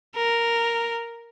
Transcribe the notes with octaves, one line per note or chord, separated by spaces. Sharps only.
A#4